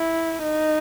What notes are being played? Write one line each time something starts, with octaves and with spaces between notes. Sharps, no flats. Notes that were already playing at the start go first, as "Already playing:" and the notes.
Already playing: E4
D#4